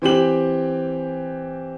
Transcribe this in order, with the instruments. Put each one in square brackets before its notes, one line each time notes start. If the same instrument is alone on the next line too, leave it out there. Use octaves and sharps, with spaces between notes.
[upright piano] E3 C4 G4 F#7